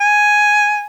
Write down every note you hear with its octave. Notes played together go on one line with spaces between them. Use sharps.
G#5